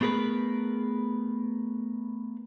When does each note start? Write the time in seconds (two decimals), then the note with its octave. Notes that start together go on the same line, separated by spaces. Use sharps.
0.01 A3 B3 G#4 A#4 B4